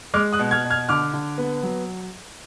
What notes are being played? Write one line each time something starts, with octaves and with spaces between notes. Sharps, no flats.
G#3 D6 F6
D#6 F#6
B2
F6 G#6
B2
F6 G#6
D3 D6 F6
D3
B3
F#3